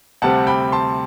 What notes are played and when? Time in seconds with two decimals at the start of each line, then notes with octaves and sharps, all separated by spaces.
0.22 D2 C3 G3 C4 F#5 A5
0.47 G5 B5
0.72 A5 C6